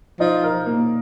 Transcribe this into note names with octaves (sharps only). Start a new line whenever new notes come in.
F3 D#4
A#4
A#3